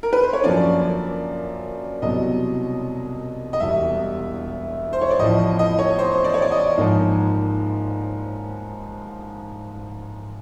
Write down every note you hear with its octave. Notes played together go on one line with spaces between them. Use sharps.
A#4
B4
C5
C#5
F#2 D3 F3 A#3 C#4 D5
C2 B2 F#3 D#5
D#5
E1 E2 B2 G3 E5
C5
C#5
D5
A1 A2 F3 D#5
D#5
C#5
C5
D5
C#5
D5
D#5
G#2 F3 A#3 D#4